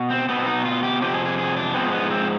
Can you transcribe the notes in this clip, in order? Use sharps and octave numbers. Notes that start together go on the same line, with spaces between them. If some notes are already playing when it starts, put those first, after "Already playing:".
Already playing: B2
C4
B2 B3 C4
D#4
F4
G4
F2 C3 F3 G4
G#4
G#4
G#4
D4
G#2 F3 G#3 B3 C4
B3
C4